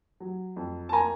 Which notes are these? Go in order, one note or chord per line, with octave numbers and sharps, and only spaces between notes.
F#3
F2
A5
A#3 G#5 A#5